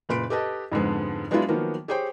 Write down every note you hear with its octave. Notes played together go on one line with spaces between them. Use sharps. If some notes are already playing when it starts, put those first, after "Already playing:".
F#1 A#2 B4 B5 C6 D7
G4 A4 B4 D#5 A5
F2 G#2 D3 G#3 B3
F#3 G#3 B3 D4 E4 F4
D#3 F3 F#3 A#3 B3
G4 G#4 C5 C#5 G5